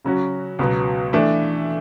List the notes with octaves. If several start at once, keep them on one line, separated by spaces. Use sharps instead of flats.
C#3 F#3 C#4 F#4
C#2 B2 F#3 B3
E3 A3 D4